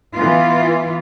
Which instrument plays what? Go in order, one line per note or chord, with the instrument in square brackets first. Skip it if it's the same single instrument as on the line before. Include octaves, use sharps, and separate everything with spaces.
[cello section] E3 B3 F4